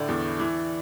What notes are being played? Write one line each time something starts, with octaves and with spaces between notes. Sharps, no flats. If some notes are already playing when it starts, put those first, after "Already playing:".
Already playing: A2 D3 D5
E2
E3